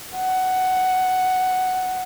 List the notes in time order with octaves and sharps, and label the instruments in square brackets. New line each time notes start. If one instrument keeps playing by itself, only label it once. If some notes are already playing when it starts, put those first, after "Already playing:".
[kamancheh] F#5